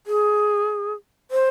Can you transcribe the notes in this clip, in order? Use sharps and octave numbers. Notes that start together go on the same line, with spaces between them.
G#4
C5